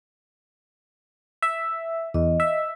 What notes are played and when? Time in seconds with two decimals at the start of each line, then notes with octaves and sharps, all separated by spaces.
1.42 E5
2.14 E2 D#5
2.40 E5